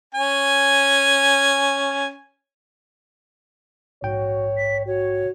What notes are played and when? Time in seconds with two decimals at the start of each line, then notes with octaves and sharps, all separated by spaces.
0.15 C#4 G#5
4.02 A#1 G#2 F#4 C#5 G5
4.57 B6
4.86 F#4 C#5